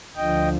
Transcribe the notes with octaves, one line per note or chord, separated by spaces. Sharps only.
D2 D3 F3 D#5 G5